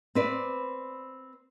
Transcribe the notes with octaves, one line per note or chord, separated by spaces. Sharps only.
C4 B4 D5